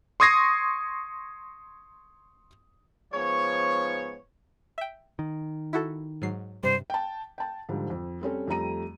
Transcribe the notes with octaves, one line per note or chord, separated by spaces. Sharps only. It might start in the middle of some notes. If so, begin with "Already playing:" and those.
C6 C#6 D#6 G#6 A#6 C7
G#2 F3 B3 C#5
E5 G5
D#3
E4 F#4 A4
G#2 F#3 C7
G2 C3 G3 C5
G5 A5
G5 A5
G#2 D3 F3 G3
F2
G3 C4 C#4 A4
F2 G3 A3 A#5 D#7